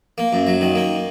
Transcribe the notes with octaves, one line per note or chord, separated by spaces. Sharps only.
A#3
F#2
F#3
D#3
A#3